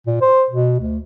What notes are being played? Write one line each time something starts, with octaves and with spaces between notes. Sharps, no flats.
A#2
C5
B2
D2